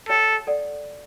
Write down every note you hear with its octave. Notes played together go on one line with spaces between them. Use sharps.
G4 A4 C#5 E5 G5
A4 D5 F#5